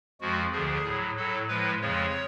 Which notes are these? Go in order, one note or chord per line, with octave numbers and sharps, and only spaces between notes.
F2 F3 G#3 F#4
D2 D3 F3 G#4
A2 F#3
A2 F#3 A4
A2 F3 G#3 B4
F2 C#3 F3 G#3 C#5